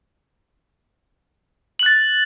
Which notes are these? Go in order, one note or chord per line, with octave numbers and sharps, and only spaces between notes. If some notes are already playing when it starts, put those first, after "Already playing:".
F#6 A6 F#7